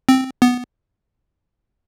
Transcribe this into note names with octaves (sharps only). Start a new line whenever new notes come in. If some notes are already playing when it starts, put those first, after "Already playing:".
C4
B3